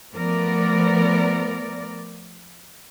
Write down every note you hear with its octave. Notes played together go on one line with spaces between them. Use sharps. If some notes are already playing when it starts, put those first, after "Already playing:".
F3 A3 B3 A#4 D5